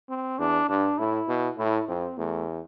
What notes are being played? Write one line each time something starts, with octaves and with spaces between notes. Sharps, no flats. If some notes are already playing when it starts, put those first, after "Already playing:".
C4
E2 D4
G2 D4
A2 E4
B2
A2 E4
F2 C4
E2 A3